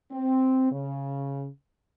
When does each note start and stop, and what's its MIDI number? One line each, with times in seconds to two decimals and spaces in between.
0.12 0.68 60
0.72 1.47 49